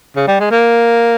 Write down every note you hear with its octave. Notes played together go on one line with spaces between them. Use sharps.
C#3
G3
G#3
A#3